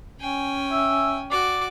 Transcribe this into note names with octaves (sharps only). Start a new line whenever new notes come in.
C#4 G5 G#5
E5
F#4 D5 D6